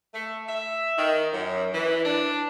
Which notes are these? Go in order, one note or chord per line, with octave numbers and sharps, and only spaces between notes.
A3
E5
D#3
F#2
E3
D4